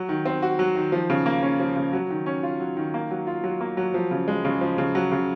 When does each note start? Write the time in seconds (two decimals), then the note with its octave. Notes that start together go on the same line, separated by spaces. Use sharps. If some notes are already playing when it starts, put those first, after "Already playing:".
Already playing: F#3
0.09 D#3
0.26 C4
0.42 F#4
0.59 F#3
0.76 D#3
0.92 F3
1.10 C#3
1.26 A#3
1.43 C#4
1.60 F3
1.76 C#3
1.93 F#3
2.10 D#3
2.26 C#4
2.43 F4
2.60 F#3
2.77 D#3
2.94 A#3
3.11 F#3
3.27 F4
3.44 F#3
3.61 A#3
3.77 F#3
3.94 F3
4.11 C#3
4.28 G#3
4.45 C#3
4.61 F3
4.78 C#3
4.95 F#3
5.12 C#3